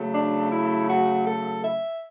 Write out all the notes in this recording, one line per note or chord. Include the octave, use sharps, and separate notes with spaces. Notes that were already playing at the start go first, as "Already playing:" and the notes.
Already playing: C#3 F#3 A3
D4
E4
F#4
A4
E5